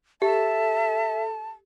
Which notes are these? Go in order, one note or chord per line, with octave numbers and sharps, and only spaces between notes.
G4 A4 E5 A5